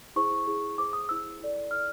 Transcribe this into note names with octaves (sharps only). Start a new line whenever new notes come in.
E4 G#4 C5 C#6
E4 G#4 C5
E4 G#4 C5 D6
D#6
E4 G#4 C5 E6
E4 A4 D5
E4 A4 D5 F6